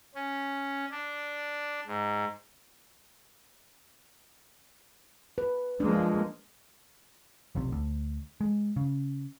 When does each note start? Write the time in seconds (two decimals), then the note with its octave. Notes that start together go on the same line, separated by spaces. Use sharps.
0.15 C#4
0.91 D4
1.87 G#2
5.38 B4
5.80 F3 G#3 A#3 D4
7.55 F1 B1 C3
7.72 D2
8.41 G#3
8.76 C#3